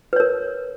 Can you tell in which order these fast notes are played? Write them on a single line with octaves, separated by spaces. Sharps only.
B4 C#5 A#4